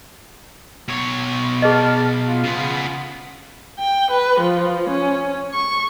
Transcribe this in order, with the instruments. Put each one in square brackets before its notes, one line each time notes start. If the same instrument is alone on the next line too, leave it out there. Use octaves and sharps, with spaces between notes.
[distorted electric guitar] B2 C#5
[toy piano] G#4 D#5 [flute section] A5 F6
[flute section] F4
[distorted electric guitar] C#3 B3
[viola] G5
B4
F3
C#4
C#6